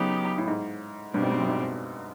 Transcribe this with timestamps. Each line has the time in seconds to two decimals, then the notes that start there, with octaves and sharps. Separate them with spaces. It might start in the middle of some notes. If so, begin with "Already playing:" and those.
Already playing: C#3 F#3 B3 D#4 G4
0.38 A2
0.47 G#2
1.14 G2 B2 G3 C4
1.22 G#2
1.31 G2
1.40 F#2
1.48 G#2